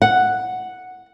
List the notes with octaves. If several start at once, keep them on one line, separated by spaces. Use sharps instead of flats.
F#5